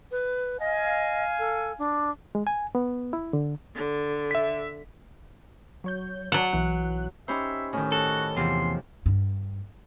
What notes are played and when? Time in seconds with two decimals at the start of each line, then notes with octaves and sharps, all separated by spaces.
0.11 B4
0.60 D#5 F5 G#5
1.39 A4
1.78 D4
2.35 G#3
2.47 G#5
2.75 B3
3.13 E4
3.33 D3
3.75 D3
4.31 E5 B6
5.84 F#3 C#5 G6
6.32 F#3 D5 F#5 A5
6.53 B1 E3 F#6
7.28 C#4 D#4 G4 C5 E5 B5
7.73 A2 D#3 C#4
7.92 F#4 A4
8.37 E2 C3 F3 C6
9.06 G2 D4